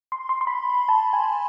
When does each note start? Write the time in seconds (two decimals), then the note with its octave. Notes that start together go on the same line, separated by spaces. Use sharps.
0.12 C6
0.29 C6
0.41 C6
0.47 B5
0.89 A5
1.13 G#5